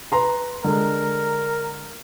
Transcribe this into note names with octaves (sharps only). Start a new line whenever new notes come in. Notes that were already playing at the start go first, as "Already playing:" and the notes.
B4 A#5 C6
D3 G#3 A#4